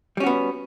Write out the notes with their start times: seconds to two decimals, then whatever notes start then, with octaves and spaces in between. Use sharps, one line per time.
0.17 G3
0.20 C#4
0.23 F#4
0.27 B3